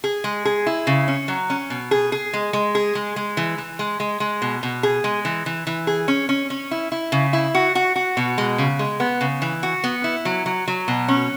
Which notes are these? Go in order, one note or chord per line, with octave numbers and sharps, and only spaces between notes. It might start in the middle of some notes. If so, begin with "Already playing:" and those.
G#4
G#3
G#4
E4
C#3
C#4
F#3
C#4
B2
G#4
G#4
G#3
G#3
G#4
G#3
G#3
E3
E3
G#3
G#3
G#3
B2
B2
G#4
G#3
E3
E3
E3
G#4
C#4
C#4
C#4
E4
E4
C#3
E4
F#4
F#4
F#4
B2
G#3
C#3
G#3
B3
C#3
E3
F#4
B3
E4
F#3
F#3
F#3
B2
C#4